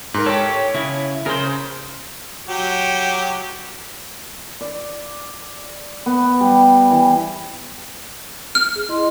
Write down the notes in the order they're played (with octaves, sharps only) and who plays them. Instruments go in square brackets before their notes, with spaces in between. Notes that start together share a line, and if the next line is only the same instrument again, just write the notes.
[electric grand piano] G#2 A#4
[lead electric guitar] G4 A4 [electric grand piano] C#5 C#6
[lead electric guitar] C#3 E4
[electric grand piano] C#3 [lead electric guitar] A#4 C5
[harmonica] F#3 G4
[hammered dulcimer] D5
B3
G3
E3
[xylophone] F6
[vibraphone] G#4
E4 D#5 C6